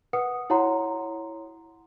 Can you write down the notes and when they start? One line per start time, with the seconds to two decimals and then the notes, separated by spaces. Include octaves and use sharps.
0.13 B4 F#5 D#6 C#7
0.50 E4 F#4 C#5 F#5 A#5 C6